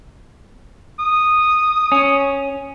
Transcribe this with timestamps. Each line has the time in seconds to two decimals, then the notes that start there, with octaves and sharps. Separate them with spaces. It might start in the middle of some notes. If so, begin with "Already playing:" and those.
1.00 D#6
1.92 C#4